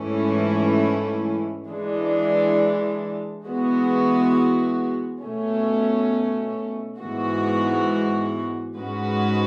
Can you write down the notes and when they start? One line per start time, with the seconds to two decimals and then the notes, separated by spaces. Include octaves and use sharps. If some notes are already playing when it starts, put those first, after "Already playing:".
Already playing: G#2 E3 A3 C#4 E4
1.67 E3 G#3 D4
3.45 E3 G#3 B3 F#4
5.22 B2 A3 C#4
6.99 G#2 E3 G#3 B3 F#4
8.77 G#2 G#3 C#4 F#4 B4